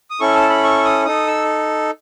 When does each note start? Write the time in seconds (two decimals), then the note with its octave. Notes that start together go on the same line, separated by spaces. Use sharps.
0.11 D#6
0.20 C#4 E4 A4 C#6
0.35 A5
0.49 B5
0.64 C#6
0.85 D#6
1.05 D#4 A4 D#6
1.27 E6